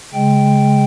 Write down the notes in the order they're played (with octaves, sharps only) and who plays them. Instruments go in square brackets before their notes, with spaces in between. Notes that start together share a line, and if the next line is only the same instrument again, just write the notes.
[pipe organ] C#3 G#3 G5